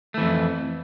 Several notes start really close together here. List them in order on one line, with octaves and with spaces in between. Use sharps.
A3 E3 F2